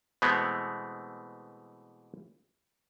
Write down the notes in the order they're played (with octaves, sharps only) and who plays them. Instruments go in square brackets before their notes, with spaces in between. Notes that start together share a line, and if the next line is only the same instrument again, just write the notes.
[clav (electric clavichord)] B2 E3 G#3 A3 B3 C4